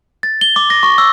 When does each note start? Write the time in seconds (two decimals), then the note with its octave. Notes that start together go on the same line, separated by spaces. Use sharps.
0.23 A6
0.41 G7
0.56 D6
0.70 A#6
0.83 C#6
0.98 E6